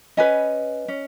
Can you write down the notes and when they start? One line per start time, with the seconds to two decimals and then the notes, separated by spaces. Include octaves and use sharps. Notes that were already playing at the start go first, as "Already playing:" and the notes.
0.17 C#4 B4 D#5 G#5
0.88 C#4